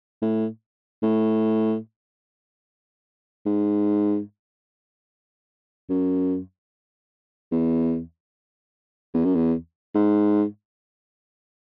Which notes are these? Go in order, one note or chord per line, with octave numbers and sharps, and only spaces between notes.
A2
A2
G#2
F#2
E2
E2
F#2
E2
G#2